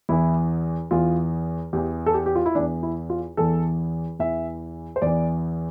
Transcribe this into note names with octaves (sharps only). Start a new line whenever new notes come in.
E2 E3 E4
E2 E3 F4
E2 E3 G4
A4
G4
G4
F4
E4
E2 E3 D4
E4
F4
E2 E3 A4
E2 E3 E5
C5
E2 E3 D5